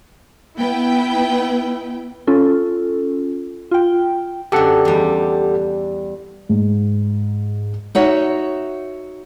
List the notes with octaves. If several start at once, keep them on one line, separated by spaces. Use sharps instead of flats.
B3 E4 B4 G5
C#4 F4 A4
F4 G5
F#2 D3 G4 A4 F#5
E2 G3
G#2
D#4 F#4 C#5 E5